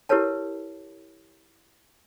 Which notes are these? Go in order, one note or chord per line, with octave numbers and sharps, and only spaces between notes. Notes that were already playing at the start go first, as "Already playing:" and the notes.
E4 G4 A#4 B4 C#5 A5